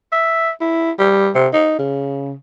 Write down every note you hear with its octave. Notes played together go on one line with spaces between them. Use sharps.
E5
E4
G3
C3
D#4
C#3